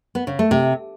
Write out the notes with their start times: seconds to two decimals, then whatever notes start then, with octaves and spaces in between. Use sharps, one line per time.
0.15 B3
0.27 C#3
0.39 A3
0.51 C3